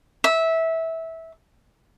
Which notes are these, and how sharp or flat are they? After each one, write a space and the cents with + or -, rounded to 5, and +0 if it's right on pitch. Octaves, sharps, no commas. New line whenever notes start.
E5 -15